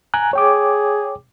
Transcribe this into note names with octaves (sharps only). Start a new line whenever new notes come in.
G#5 A#5 F#6
G#4 C#5 G5 D6